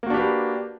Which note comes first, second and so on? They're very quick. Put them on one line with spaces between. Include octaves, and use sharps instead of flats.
A#3 F#4 D4 G4 B4